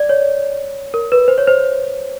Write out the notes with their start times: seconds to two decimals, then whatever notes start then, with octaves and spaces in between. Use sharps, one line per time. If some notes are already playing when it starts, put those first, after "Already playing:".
Already playing: D5
0.09 C#5
0.94 A#4
1.12 B4
1.28 C5
1.38 C#5
1.47 C5